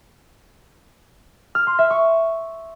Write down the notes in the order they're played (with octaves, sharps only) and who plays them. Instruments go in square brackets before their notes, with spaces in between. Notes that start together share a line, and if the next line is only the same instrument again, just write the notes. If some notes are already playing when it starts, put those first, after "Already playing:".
[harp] F6
C6
E5
C#6